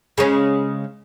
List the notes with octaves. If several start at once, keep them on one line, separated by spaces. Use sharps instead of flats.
C#3 G#3 C#4